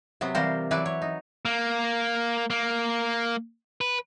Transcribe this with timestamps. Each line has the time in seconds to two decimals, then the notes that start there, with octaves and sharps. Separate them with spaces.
0.21 C3 F#3 B3
0.35 C3 E3 G3 F4 A#4 C5
0.71 E3 F#3 E4 B4 D5
0.86 C#5
1.02 D#4
1.45 A#3
2.50 A#3
3.81 B4